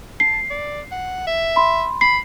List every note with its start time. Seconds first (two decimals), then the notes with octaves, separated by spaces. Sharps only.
0.20 A5 C7
0.50 D5
0.91 F#5
1.27 E5
1.56 B5 C6
2.01 B5 C7